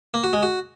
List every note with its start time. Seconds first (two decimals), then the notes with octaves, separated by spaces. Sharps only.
0.14 A#3
0.24 F#4
0.33 G#3
0.43 F#4